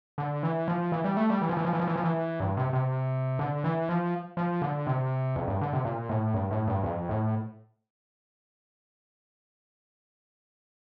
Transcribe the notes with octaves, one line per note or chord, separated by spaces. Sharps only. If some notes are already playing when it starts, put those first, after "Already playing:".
D3
E3
F3
E3
G3
A3
G3
E3
F3
E3
F3
E3
F3
E3
F3
E3
G2
C3
C3
D3
E3
F3
F3
D3
C3
F2
G2
D3
C3
A#2
A2
G2
A2
G2
F2
A2